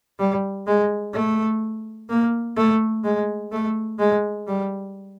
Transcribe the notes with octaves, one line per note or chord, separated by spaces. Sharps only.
G3
G#3
A3
A#3
A3
G#3
A3
G#3
G3